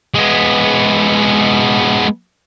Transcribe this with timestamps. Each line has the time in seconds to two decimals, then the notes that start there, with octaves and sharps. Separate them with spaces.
0.14 G#3 B3